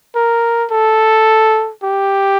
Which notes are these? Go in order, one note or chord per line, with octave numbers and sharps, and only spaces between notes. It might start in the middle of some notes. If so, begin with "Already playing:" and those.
A#4
A4
G4